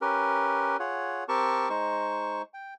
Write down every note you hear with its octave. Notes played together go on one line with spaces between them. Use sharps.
C#4 G4 A#4 B4
F4 G#4 C#5 F#5
C4 G4 A#4 A5 C#6
G#3 D#4 C5 C#6
G5